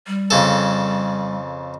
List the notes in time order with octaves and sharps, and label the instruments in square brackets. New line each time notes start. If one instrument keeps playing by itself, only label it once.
[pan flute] G3
[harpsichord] F2 C#3 A4